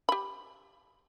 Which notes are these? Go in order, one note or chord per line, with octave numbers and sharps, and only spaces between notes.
G4 B5